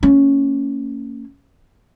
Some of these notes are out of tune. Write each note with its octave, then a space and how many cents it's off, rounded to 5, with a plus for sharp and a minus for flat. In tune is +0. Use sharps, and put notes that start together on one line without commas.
A#3 -35 C#4 +0